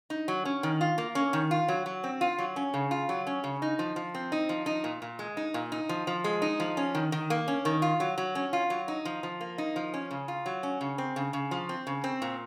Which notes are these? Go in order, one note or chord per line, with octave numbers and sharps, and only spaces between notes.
D#4
F#3
C#4
D#3
F4
A#3
C#4
D#3
F4
F#3
F#3
C4
F4
F#3
C#4
C#3
F4
F#3
C#4
C#3
D#4
F3
F3
C4
D#4
F3
D#4
A#2
A#2
G#3
D#4
A#2
D#4
F3
F3
G#3
D#4
F3
C#4
D#3
D#3
A#3
C#4
D#3
F4
F#3
F#3
C#4
F4
F#3
D#4
F3
F3
A#3
D#4
F3
C#4
C#3
F4
F#3
C#4
C#3
C4
C#3
C#3
F3
C4
C#3
C4
A#2